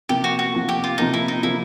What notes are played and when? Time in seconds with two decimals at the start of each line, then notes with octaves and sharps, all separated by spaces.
0.09 C3 F3 A#3 G4
0.24 F#4
0.39 F#4
0.53 C3 F3 A#3
0.69 G4
0.84 F4
0.98 C3 F3 A#3 D#4
1.13 E4
1.28 D#4
1.43 C3 F3 A#3 E4